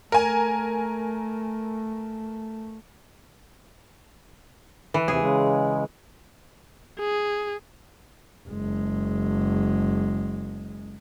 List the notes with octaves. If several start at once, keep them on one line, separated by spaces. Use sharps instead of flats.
A3 A#4 G#5
E3
D#2 C3 G#4
C#3 G#3
G#4
F#1 G#3